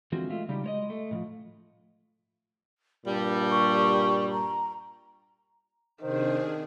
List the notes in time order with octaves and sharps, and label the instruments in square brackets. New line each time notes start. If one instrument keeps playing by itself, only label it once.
[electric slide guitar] D3 E3 F3 G#3 C4 F#4
G#3 A3 F4 E5
C#3 G3 D#4 G4
G#3 C#5 D#5
A3
A2 E3 F3
[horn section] G2 A#2 G3 [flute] D5
[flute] C#6
A#5
[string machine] C3 D4 G#4 [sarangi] D#3 [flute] C5